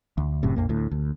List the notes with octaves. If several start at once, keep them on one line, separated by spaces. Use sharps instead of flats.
D2
F#1 F#2 A2 C3
A#1 F2 A#3
D2 A2
D2